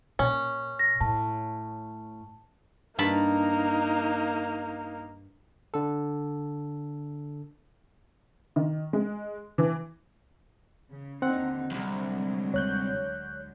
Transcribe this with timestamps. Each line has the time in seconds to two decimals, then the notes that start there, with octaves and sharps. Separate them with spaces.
0.19 A#2 C#4
0.79 A#6
1.01 A2 A5
2.99 G2 A#3 D#4 A5 B5
5.74 D3 A4
8.56 D#3
8.93 G#3
9.58 E3
10.91 C#3
11.22 D#2 D3 C4 D#4 F#5
11.71 C2 F2 D3 F#3 G#3
12.54 D2 C#5 F#6 G6